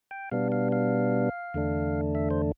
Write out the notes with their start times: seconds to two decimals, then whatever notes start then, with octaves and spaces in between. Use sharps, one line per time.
0.11 G5
0.31 B2 G3 B3 D4 F5
0.52 F5
0.72 F5
1.54 E2 D3 A3 D4
2.15 E5
2.31 C5